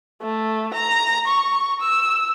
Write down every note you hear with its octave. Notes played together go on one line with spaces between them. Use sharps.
A3
A#5
C#6
E6